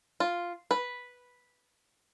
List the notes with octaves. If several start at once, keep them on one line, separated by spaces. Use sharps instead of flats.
F4
B4